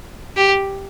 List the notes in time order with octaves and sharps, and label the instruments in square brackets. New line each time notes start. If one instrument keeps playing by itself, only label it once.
[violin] G4